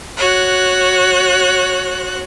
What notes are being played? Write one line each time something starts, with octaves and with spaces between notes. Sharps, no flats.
F#4 C#5 F#6